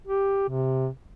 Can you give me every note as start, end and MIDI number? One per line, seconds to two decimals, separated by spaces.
0.07 0.48 67
0.49 0.88 48